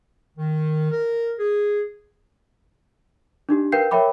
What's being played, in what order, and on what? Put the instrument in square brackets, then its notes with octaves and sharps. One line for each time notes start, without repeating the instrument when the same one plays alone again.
[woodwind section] D#3
A#4
G#4
[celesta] D4 D#4 G4
A#4 B4 F5 G5 G6 C7
A#4 C#5 E5 G5 B5 D6